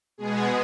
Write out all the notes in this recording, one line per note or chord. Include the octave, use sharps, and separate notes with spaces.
B2 G#3 B3 G#4